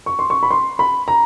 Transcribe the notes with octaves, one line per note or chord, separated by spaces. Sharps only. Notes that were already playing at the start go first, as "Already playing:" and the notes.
C#6
C6
C#6
B5
C6
B5
A#5